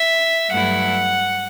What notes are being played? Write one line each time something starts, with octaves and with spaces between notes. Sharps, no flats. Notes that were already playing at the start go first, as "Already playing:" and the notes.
Already playing: E5
G2 F#3 A3 E4 F#5